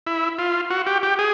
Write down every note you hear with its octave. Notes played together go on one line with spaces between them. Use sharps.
E4
F4
F#4
G4
G4
G#4